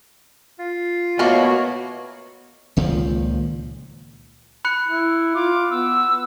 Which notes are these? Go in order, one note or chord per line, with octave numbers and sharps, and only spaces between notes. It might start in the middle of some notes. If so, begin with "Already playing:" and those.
F4
B2 A3 A#3 F#4 A#4 C#5
C#2 A#2 D#3 F3
B5 F#6 C#7
E4
F4 D6
B3 E6